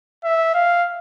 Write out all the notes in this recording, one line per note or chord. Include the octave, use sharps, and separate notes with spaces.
E5
F5